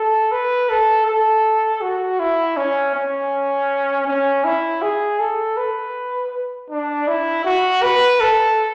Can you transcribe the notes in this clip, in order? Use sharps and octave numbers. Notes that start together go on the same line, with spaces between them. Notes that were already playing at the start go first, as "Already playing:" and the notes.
Already playing: A4
B4
A4
A4
F#4
E4
C#4
C#4
C#4
E4
G#4
A4
B4
D4
E4
F#4
B4
A4